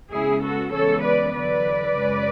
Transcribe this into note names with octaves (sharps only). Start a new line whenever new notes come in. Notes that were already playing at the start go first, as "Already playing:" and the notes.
C#3 G#3 B3 E4 G#4
F#4 A4
C#3 E3 G#3 B3 A4 C#5
B4 D5
E2 D3 F#3 B4 D5
F#2 C#3 G#3